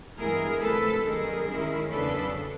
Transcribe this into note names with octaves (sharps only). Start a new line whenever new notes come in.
G2 E3 G#3 B3 E4 G#4 A#4
D2 C3 F3 A4 B4
F#2 D#3 G3 A#3 D#4 G#4 A#4
D#3 G#3 C#4 E4
E2 C#3 F#3 B3 D4 A4 B4